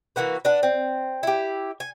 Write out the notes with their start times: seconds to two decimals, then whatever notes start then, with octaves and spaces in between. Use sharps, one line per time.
0.16 E3 A#3 F#4 B4
0.45 D4 B4 F#5
0.63 C4
1.23 E4 G4
1.80 G#5